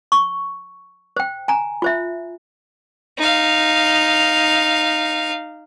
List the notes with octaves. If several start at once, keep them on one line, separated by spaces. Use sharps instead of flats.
C#6
C5 G5
G#5 A#5
F4 C5 E5
D#4 F5